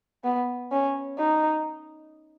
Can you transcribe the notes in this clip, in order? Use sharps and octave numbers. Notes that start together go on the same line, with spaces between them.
B3
C#4
D#4